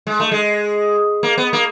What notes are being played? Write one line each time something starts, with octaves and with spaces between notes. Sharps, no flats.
G#3
A3
G#3
A#3
B3
A#3